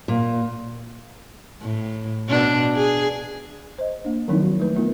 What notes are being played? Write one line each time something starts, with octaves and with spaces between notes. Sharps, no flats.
A#2
A2
B2 D4
G#4
C5 D#5
A#3 D4
D#3 F3 F#3 C4 D#4 E4
F#4
A3 B4
A3 B3 D#4 F4 A#4